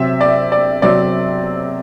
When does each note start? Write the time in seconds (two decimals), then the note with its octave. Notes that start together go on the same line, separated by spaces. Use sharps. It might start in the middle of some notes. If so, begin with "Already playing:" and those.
Already playing: C3 F#3 C4 E5
0.21 D5
0.52 D5
0.82 C3 F#3 C4 D5